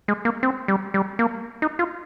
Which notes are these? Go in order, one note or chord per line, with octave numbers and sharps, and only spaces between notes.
G#3
A#3
C4
G3
G3
A#3
D#4
F4